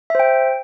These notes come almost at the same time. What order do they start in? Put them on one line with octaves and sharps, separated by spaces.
E5 C5 G5